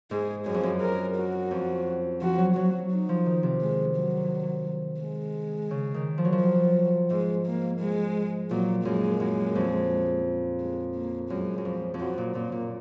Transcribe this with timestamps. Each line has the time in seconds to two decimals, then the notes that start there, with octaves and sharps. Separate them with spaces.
0.11 G#2 G#4
0.46 F#2 G#4
0.54 F2
0.63 F#2
0.81 A#4
1.15 F#4
1.51 F2
2.21 F3 F#4
2.38 F#3
2.55 F#3 F#4
2.73 F#3
2.91 D#4
3.09 F3
3.26 D#3
3.43 C3
3.61 G#3
3.96 F#3
5.00 G#3
5.71 C#3
5.94 D#3
6.18 F3
6.25 F#3
6.32 F3
6.41 F#3
7.10 G#2 G#3
7.46 A#3
7.80 G#3
8.51 A#2 F#3
8.85 F#2 G#3
9.20 F#2
9.55 F2
10.60 G#3
10.95 A#3
11.30 F#2 G#3
11.58 F#2
11.65 F2
11.94 F2
12.00 F#2 F#4
12.18 A#2
12.35 A#2 A#3
12.52 A#2